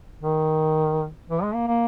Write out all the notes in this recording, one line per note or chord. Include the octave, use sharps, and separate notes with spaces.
D#3
E3
G#3
A#3
A#3